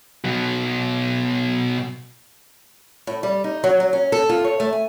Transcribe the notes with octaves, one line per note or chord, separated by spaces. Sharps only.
B2 F#3
A2
G3
D#4
F#3
F#3
C#4
A4
F4
C#5
A3
G#5